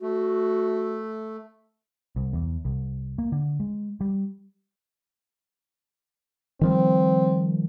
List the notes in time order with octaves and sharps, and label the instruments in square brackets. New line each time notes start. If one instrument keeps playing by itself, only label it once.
[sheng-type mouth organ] A3 [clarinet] F#4
[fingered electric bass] C2
E2
C2
A#3
D3
G#3
G3
[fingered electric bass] D#3 F3 G3 [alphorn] C4